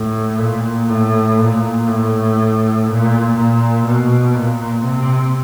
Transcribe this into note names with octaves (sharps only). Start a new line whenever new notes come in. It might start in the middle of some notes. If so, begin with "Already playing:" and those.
Already playing: A2
A#2
A2
A#2
A2
A#2
A#2
B2
A#2
C3